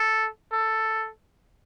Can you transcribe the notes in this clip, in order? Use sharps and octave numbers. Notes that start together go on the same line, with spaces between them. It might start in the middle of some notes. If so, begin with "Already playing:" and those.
Already playing: A4
A4